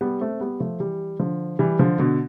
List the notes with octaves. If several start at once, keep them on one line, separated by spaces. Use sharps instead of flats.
G3 B3
A3 C4
G3 B3
F3 A3
E3 G3
D3 F3
E3 G3
D3 F3
B2 D3